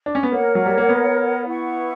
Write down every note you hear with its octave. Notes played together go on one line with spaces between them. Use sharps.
D4
C#4
B3
A#3 A#4 C#5 F#5
F#3
G3
A#3
B3
E4 B4 F#5 C#6